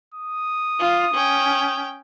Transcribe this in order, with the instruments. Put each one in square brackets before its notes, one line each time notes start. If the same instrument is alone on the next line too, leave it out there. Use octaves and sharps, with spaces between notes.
[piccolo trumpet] D#6
[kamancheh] F4
C#4 G5